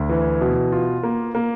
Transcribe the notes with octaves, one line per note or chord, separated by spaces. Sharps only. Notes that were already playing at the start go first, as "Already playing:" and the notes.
Already playing: D2
E3
B2
F4
A#3
A#3